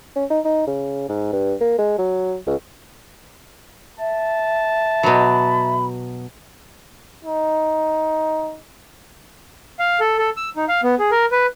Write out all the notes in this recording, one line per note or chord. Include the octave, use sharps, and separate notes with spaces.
C#4
D#4
D#4
C#3
G#2
G2
A#3
G#3
F#3
C#2
E5 A5
B2 F#3 B5
D#4
F5
A4
A4
E6
D#4
F5
B3
G#4
A#4
B4